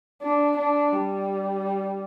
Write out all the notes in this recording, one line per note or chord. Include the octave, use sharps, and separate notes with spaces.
D4
D4
G3